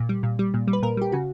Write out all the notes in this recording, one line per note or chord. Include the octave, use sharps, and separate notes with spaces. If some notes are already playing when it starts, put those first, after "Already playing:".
Already playing: A#2
G3
A#2
G3
A#2
G3
B4
A#2 A#4
G3 G4
C#3 F#4